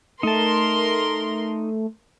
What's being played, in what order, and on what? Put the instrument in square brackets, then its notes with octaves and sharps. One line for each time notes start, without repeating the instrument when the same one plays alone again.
[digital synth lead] A3 [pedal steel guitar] D#4 A5 [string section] A#4 C6